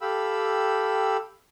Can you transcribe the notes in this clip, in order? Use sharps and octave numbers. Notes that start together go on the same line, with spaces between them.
G4 A4 F5 G5 B5 E6